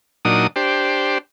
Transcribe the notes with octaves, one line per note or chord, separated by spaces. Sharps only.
A#2 F#3 D4 D#4 D#6
D4 G4 C5